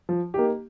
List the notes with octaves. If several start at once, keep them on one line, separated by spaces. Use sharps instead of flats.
F3
A#3 D#4 G4